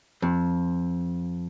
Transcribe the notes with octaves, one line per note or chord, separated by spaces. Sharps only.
F2